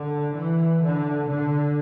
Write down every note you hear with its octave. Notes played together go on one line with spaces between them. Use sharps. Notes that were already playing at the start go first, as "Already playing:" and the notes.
Already playing: D3
E3
D3
D3